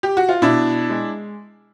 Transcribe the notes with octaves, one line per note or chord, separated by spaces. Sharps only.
G4
F#4
F4
B2 D4 E4
G#3